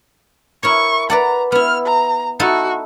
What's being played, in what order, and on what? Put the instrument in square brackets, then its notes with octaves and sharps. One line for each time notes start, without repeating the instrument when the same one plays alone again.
[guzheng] E4 A#4 C#5 [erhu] C#6
[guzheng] B4 D5 F#5 [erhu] A#5
[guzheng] B3 E4 [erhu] F6
[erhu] A#5
[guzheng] D#4 E4 A4 [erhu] F#4